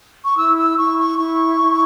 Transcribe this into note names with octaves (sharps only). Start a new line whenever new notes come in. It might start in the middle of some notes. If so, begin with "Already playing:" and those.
C#6
E4 E6
E6
E4 C#6
C#6
E4 C#6
E4